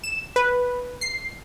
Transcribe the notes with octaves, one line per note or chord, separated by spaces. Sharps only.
E7
B4
C7